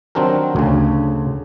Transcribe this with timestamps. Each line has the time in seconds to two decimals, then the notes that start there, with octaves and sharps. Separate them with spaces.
0.15 D#3 F#3 C4 D4 G4 A#4
0.56 D2 C#3